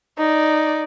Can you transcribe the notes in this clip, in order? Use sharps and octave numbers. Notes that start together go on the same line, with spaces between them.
D#4 D5